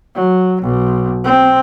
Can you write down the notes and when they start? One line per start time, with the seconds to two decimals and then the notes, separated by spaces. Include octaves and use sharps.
0.15 F#3
0.62 B1
1.24 C4